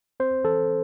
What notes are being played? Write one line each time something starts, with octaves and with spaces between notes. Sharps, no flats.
C4 C5
E3 A4